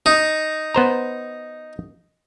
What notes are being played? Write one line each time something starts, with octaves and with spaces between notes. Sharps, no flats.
D#4
B3 C5 A#5